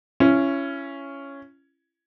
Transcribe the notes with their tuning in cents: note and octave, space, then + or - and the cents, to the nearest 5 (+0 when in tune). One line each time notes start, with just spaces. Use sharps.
C#4 +0 E4 +35